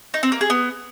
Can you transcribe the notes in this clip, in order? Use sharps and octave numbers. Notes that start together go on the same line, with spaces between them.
D#4
C4
A#3
G#4
B3